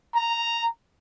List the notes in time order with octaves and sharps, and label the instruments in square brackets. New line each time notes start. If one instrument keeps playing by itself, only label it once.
[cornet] A#5